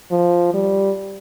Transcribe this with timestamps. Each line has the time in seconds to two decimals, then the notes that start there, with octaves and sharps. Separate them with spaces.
0.11 F3
0.54 G3